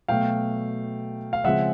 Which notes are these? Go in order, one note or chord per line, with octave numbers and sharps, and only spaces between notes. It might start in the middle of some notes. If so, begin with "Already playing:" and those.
B2 F#3 A3 F5 G5
F5
C#3 F3 G#3 C4 E5 F#5